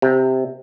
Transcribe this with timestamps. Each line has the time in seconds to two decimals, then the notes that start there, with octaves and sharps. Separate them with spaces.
0.02 C3